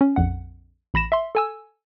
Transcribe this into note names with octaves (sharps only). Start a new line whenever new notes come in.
C#4
A#1 F2 F#5
A1 B5 A#6 E7
E5 C6
A4 G#5 E6